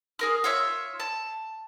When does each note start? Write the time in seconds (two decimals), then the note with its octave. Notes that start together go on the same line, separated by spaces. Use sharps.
0.19 G#4 A#4 F6
0.44 F4 C#5 E5
1.00 A5